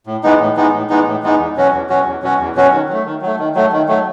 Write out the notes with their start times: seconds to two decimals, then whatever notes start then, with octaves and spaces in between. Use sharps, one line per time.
0.07 A2
0.23 E3 G#3 B3 D#4
0.39 A2
0.56 E3 G#3 B3 D#4
0.73 A2
0.90 E3 G#3 B3 D#4
1.06 A2
1.23 E3 G#3 B3 D#4
1.39 E2
1.56 B2 F#3 C#4 F#4
1.73 E2
1.89 B2 F#3 C#4 F#4
2.06 E2
2.23 B2 F#3 C#4 F#4
2.39 E2
2.55 B2 F#3 C#4 F#4
2.72 D#3
2.89 F#3 A3
3.05 D#3
3.22 F#3 A3
3.39 D#3
3.55 F#3 A3
3.72 D#3
3.88 F#3 A3